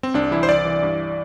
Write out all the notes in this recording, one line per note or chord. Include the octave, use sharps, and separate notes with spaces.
C4
C2 D4
E3 E4
C5
C2 D5
E3
G2